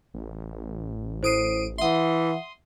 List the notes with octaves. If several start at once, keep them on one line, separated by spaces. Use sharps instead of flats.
A1
A2 C5 D#6 C7 D7 D#7
E3 E5 F#5 C6 D#6